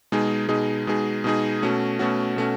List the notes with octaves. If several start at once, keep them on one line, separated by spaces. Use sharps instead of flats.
B2 G#3 D#4 G#4
B2 G#3 D#4 G#4
B2 G#3 D#4 G#4
B2 G#3 D#4 G#4
B2 A3 C#4 F#4
B2 A3 C#4 F#4
B2 A3 C#4 F#4